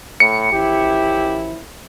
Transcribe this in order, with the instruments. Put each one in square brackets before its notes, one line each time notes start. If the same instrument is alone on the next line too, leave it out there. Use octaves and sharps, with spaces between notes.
[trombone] A2 [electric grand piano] C#7
[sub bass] A1 [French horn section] F#2 F3 E4 [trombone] G4